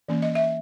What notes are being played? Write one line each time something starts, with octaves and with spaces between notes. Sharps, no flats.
E3 A#3 C#4
D#5
E5